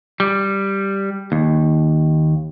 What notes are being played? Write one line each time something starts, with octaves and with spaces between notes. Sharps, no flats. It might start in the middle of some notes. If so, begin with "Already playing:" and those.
G3
D#2